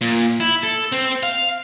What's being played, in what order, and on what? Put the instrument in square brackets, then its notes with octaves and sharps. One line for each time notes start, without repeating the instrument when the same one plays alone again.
[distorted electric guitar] A#2
E4
A4
C4
F5